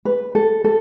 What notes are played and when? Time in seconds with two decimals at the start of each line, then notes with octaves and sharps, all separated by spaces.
0.05 B4
0.35 A4
0.64 A4